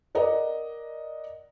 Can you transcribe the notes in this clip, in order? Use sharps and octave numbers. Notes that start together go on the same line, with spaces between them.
A#4 D5 D#5 F#5 A#5